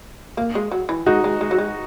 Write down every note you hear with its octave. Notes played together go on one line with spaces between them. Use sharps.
A#3
G#3
F#3
E3
G#3 D#4 F#4
G#3
G#3
F#3
G#3